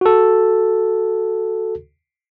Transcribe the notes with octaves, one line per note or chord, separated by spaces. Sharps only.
F#4 A4